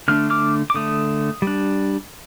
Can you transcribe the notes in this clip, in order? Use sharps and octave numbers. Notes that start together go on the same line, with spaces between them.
D3 A3 D4 F6
D6 F6
D6
D3 A3 D#6
G3
D4